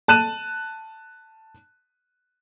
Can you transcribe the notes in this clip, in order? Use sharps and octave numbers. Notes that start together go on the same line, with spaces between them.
A5 F#6 D#7 E7